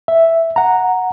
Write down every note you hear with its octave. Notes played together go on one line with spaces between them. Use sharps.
E5
F#5 A#5